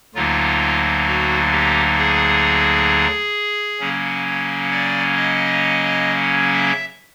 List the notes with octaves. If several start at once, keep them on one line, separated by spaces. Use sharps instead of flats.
D2 D3 F#3 A#3 D#4 F4
F#4
G4
G#4
C#3 F#3 A#3 C#4
D5
D#5
E5